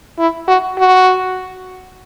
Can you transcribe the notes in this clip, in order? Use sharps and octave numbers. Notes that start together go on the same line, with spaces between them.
E4
F#4
F#4